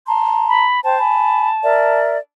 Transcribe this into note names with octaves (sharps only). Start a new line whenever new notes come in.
A5 A#5 C6
B5
C5 G5 A5
G#5 B5
A#4 D5 E5